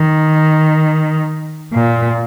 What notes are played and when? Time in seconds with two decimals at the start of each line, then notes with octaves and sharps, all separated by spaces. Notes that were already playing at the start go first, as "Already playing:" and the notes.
Already playing: D#3
1.73 A#2